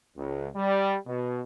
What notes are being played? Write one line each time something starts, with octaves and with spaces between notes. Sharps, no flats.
C#2
G3
B2